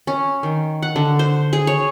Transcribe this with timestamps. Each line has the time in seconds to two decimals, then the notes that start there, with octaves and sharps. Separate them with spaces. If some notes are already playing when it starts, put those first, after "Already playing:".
0.07 C#4
0.43 D#3
0.82 F#5
0.96 D3
1.19 C5
1.53 G#4
1.67 C#5